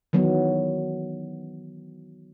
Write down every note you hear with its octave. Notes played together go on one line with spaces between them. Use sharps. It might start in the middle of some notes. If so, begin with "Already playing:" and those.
D#3 E3 F#3 B3